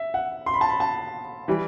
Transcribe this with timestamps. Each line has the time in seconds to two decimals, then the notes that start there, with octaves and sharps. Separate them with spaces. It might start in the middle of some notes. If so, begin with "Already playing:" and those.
Already playing: E5
0.14 F#5
0.46 C6
0.54 B5
0.61 A5
0.69 B5
0.80 A5
1.48 E3 G3